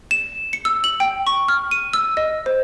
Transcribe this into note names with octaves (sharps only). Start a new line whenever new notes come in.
E7
C#7
E6
F#7
G5
C#6
F6
D#7
E6
D#5
C5